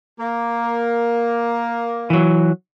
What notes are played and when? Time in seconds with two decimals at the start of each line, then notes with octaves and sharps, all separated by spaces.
0.19 A#3
2.10 E3 F#3